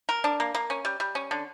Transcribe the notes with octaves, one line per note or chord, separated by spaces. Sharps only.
A#4
D4
A#3
A#3
C#4
G3
G3
C#4
D3